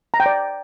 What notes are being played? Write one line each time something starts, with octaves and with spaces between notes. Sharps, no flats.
A#5
G5
D5